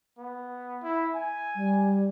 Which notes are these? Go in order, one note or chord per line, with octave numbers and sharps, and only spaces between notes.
B3
E4
G#5
G3